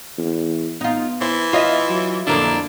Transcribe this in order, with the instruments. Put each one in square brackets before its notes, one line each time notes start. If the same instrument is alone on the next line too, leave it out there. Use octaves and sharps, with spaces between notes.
[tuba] E2
[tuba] B3 [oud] D#4 F4
[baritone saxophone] E3 [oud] C5
[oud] F4 D#5 E5
[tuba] F#3
[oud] F2 A#3 E4 [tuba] D3 [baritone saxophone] D4